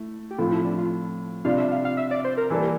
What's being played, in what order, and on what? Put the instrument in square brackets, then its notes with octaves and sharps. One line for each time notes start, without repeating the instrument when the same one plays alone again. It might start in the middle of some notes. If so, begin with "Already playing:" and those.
Already playing: [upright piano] A3 E4
[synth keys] G4
[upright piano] A2 F3 C4 F4 [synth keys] A4
[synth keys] E4
D4
F4
[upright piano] C3 G3 D4 F4 [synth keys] F5
[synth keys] E5
F5
F5
E5
D5
C5
A#4
[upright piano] E3 G3 A#3 [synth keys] A4
[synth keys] G4